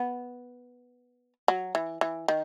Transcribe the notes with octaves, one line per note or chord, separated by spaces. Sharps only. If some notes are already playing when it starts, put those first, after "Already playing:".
Already playing: B3
F#3
E3
E3
D#3